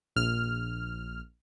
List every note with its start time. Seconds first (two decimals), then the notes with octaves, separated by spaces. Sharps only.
0.16 A#1 F6